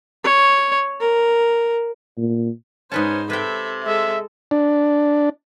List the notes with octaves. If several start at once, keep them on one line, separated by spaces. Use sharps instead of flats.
C#5
A#4
A#2
G#2 C#4 D#4 B4 C5 A5
C3 A4 B4 E5 G5
G#3 A4 E5
D4